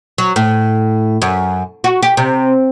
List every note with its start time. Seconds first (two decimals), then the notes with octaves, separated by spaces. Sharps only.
0.18 F#3
0.36 A2
1.22 F#2
1.84 F#4
2.03 G4
2.17 C3